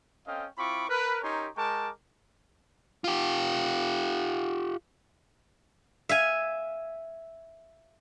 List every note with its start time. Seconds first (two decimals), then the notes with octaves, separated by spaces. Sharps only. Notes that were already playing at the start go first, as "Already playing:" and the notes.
0.27 C4 C#4 A4 D#5 F5 G5
0.58 C4 E4 F4 B5 C#6 D6
0.89 A#4 B4
1.22 C#4 D#4 G4 A#4 C#5 C6
1.56 G#3 A#4 G5 A5 C#6 D6
3.04 F4 G4
6.09 E5 F5 G#5